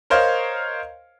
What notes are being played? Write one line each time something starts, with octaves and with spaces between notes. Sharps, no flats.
A#4 C5 C#5 D#5 F5